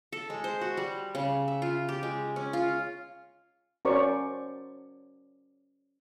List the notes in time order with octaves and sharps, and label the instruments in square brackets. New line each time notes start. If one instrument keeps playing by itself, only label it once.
[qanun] A4
G#3
C5
F#4
G3
C#3
E5
F4
G4
G#3
C#4
F4
[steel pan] C#4 F#4 A#4 C5 D5 C#6